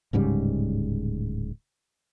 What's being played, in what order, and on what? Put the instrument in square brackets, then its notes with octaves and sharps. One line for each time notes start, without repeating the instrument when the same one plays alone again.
[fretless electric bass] D1 G#2 C#3 G3